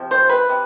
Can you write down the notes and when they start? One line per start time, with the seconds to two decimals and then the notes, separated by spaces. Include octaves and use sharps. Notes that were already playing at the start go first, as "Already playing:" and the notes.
Already playing: C3 F3
0.11 C5
0.30 B4
0.49 C3